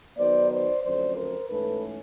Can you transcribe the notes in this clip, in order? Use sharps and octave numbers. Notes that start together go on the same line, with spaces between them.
D#3 F#3 B3 D#4 C5 D5
C5 D5
F2 D3 F#3 A3 C#4 C5 D5
A#4 C5
G#2 E3 A3 C#4 A4 B4